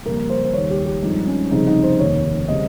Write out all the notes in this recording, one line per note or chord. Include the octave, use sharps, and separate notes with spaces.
F2 C#3 G3 A#3 A#4
C5
C5
D#2 D#3 G3 A#3 C#5
G4
G4
G2 F3 G#3 C4 D#4
C#4
F1 F2 C#3 G3 C4 D#4
D#4
C5
F1 D#2 D#3 A#3 C#5
C#3 G3 C4 D#5